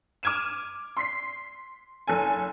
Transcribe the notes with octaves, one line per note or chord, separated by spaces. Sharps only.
D6 F6 G#6 D#7 E7
C6 B6 C7
F#1 A4 G#5